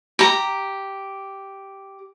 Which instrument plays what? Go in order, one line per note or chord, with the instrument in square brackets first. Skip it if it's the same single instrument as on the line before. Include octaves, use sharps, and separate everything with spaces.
[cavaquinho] G4 A#5